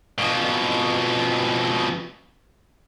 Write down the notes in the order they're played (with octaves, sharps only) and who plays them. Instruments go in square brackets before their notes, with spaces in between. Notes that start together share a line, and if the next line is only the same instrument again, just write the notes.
[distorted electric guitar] F2 B2